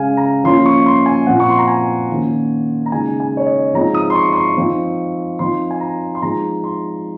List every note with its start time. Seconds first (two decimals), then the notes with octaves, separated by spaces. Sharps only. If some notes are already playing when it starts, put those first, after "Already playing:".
Already playing: C#3 G#3 C#4 F5 G#5
0.17 A#5
0.44 F3 A#3 C#4 C6
0.66 C#6
0.86 C6
1.06 G#5
1.27 A#2 F3 C4 F#5
1.40 C#6
1.49 C6
1.59 A#5
1.68 G#5
2.10 D#3 A#3 C#4
2.86 A#5
2.92 C#3 G#3 D#4 G#5
3.20 G#5
3.37 C#5
3.46 D#5
3.74 F3 G#3 C4 D#4 A#5
3.94 D#6
4.10 C6
4.15 C#6
4.33 C6
4.36 C#6
4.57 F3 C4 D#4
5.39 F3 C4 D#4 C6
5.71 G#5
5.81 A#5
6.15 C6
6.22 F3 G#3 C4 D#4 A#5
6.64 C6